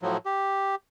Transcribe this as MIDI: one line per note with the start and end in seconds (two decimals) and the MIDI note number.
0.02 0.17 45
0.02 0.17 53
0.02 0.17 54
0.26 0.75 67